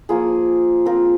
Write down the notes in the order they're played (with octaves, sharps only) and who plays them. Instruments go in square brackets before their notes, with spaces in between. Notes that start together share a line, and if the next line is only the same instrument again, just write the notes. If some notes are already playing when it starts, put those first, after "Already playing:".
[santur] F3 A#3 F4 G#4
C4 F4 A#4